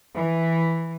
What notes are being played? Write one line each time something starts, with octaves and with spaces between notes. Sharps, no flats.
E3